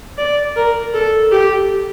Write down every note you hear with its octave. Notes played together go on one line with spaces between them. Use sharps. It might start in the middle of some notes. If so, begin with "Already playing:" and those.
D5
A#4
A4
G4